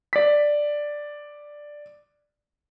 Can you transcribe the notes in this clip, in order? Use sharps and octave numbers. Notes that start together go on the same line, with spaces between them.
D5 B6